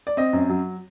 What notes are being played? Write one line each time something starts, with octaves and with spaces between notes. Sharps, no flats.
D5
C4 D#5
F#2
F#3